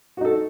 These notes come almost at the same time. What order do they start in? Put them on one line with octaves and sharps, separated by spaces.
F#4 D#4 A4